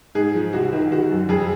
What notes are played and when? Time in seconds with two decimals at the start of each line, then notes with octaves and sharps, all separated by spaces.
0.15 G#2 G#4
0.35 F3
0.53 C2 F#4
0.73 D#3
0.91 D#3 F#4
1.11 F#2
1.29 F2 G#4